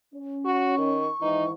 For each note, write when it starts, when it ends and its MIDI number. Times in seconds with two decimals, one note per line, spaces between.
0.15 1.09 61
0.45 0.76 66
0.45 1.52 85
0.78 1.07 51
1.21 1.51 44
1.21 1.51 51
1.21 1.51 52
1.21 1.44 63